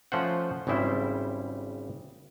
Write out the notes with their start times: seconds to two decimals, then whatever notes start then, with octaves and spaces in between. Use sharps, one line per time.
0.12 F3 A3 C#4 F4 C5 F#5
0.67 G#1 C#3 G3 E4 C5